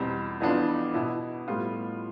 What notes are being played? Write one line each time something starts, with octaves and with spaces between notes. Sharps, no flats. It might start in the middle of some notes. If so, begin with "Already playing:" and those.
Already playing: E2 B2 G3 C4
F2 E3 B3 D4 F4
B2 B3 E4
A2 G3 B3 F4